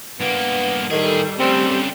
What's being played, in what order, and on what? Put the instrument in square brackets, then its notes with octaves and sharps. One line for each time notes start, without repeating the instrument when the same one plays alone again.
[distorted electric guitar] G2 A#3 [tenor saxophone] B3
[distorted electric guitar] A2 G#4 [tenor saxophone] D#3 [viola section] G3 A4
[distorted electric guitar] C#3 D4 [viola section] G3 A3 [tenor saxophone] C4